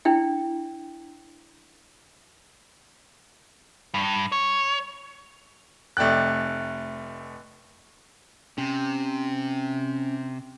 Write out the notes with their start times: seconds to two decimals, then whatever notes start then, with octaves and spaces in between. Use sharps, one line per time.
0.05 D4 E4 G5
3.94 G2
4.32 C#5
5.97 F1 A3 D5 G5 F#6
8.58 C3 C#4